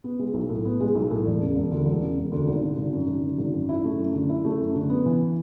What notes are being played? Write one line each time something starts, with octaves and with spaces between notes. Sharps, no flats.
B3
G#3
B1
A2
B3
G#3
B1
A2
E1
C#3
E1
D2
E1
C#3
E1
D2
G#1
D3
G#1
F#2
G#1
D3
G#1
F#2
E4
A3
F#2
D3
E4
A3
F#2
D3
B3
E3